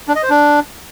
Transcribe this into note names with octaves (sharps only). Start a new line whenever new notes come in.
D4
D#5
C5
D4